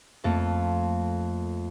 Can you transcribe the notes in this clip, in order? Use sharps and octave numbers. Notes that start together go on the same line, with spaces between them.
F2 A3 A#3